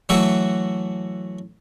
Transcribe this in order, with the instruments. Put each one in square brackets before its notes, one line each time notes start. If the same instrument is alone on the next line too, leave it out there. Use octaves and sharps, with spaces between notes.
[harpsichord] E3 F#3 A3 F#4 E5 F#5